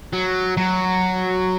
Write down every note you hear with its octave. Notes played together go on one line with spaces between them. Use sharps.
F#3
F#3